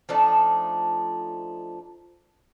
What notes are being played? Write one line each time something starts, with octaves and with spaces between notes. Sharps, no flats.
F3 A3 D4 D#4